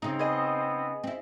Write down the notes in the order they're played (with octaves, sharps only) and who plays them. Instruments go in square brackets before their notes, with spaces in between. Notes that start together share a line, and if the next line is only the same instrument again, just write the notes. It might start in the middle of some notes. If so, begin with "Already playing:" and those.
[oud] C#3 D#4 [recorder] C4
[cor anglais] B3 [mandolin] G#4 D#5
[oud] C4 E4